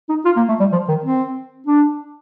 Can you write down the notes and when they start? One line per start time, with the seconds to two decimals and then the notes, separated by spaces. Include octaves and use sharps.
0.09 D#4
0.25 F4
0.36 A#3
0.48 A3
0.60 G3
0.72 F3
0.88 D#3
1.04 C4
1.67 D4